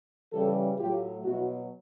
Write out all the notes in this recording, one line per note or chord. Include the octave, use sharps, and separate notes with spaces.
C#3 E3 G3 G4 A4
A2 F#3 F4 G4
B2 F#3 E4 F#4